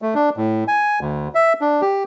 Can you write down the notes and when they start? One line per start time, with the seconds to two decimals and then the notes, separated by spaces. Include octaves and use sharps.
0.02 A3
0.15 D4
0.37 A2
0.68 G#5
1.01 D2
1.35 E5
1.61 D4
1.82 G4